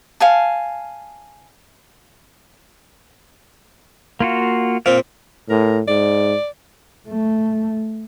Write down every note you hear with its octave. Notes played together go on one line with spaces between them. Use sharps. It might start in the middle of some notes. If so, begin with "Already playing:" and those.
F5 G#5 A5
A#3 F4 F#4
A#2 C4 F5
A2 A#4
G#2 D5
A3